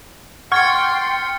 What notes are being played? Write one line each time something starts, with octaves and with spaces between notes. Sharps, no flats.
F#5 G5 C6 C#6 F6 G#6 A6 C#7